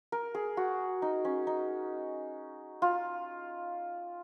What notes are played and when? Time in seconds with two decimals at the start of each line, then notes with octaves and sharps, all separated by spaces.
0.12 A#4
0.35 G#4
0.57 F#4
1.02 D#4
1.25 C#4
1.47 D#4
2.82 F4